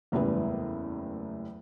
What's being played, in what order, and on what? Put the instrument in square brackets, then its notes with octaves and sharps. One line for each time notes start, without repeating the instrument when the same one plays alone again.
[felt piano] F#1 E2 A2 G3 B4